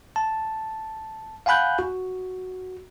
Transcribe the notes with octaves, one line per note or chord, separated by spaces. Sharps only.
A5
F5 F#5 G#5 B5 F#6 G6
F#4